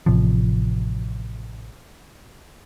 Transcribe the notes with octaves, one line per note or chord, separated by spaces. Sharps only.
A1 C3 F3